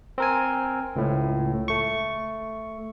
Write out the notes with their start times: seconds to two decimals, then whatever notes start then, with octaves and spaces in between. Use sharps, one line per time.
0.18 C4 A#4 G#5
0.96 C#2 A2
1.68 A3 C#6